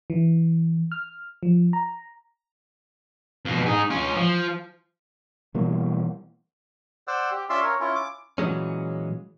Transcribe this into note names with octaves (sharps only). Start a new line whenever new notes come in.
E3
F6
F3
A#5
F2 B2
D#4 G#4
C#4 F4
F3
B2 E3 G3 A#3
C5 D5 F#5 E6
G4
C#4 F4 D5 E5 C6 E6
A#4 C#5
C#4 E4 F4
D6
A#2 E3 F#3 G#3 C#4